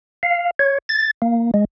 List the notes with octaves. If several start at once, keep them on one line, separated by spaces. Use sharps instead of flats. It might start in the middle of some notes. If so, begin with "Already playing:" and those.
F5
C#5
A6
A#3
G#3